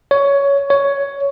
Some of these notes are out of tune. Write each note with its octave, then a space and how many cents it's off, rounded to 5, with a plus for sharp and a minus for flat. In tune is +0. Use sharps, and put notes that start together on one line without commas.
C#5 +15
C#5 +10